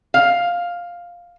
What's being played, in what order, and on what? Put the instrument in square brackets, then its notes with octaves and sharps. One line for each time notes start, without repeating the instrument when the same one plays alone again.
[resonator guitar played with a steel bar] F5